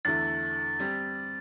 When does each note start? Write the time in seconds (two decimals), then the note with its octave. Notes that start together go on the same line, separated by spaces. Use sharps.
0.05 E2 D3 A3 E4 A6
0.79 G3 C4 G4